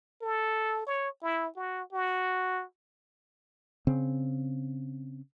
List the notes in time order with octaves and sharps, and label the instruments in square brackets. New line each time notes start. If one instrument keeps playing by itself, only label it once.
[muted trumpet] A4
C#5
E4
F#4
F#4
[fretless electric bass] C#3 C4